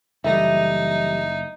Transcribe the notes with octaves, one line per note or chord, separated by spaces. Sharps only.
F#1 E3 G3 A3 D#4 E5